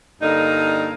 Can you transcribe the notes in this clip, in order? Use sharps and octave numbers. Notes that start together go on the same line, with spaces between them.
G2 D3 A#3 D#4